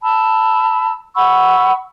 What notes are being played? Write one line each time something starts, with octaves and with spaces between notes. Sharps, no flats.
A5 B5 E6
F#5 B5 C#6 E6